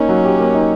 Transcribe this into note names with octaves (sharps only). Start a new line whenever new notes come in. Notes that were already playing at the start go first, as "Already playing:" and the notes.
Already playing: A#3 C#4 D#4
F#3
G4
A#3
D#4